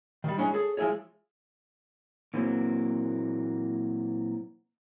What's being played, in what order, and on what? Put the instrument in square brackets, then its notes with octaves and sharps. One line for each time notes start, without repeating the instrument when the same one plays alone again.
[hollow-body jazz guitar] D#3 G3
G#3 A#3 C#4 D4 E4
G#4 A4 C#5
F3 G#3 E4 G#4 C#5
[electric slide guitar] A#2 E3 F#3 A#3 C4